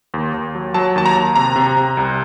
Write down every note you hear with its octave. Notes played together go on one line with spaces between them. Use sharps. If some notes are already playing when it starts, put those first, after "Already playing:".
D#2
D#2
F#3
F#3 A5
D#2 A5
A#5
D#2
C3 A#5
C3
C3
C2